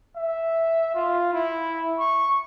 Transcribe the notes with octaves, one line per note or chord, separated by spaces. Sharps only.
E5
F4
E4
C#6